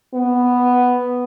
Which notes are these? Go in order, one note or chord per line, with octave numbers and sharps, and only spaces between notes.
B3